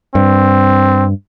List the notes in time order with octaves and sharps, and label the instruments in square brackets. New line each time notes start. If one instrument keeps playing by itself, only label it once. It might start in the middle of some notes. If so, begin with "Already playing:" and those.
[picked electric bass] G2 [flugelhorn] C4